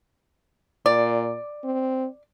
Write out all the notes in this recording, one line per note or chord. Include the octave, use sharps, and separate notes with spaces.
A#2 D5
C4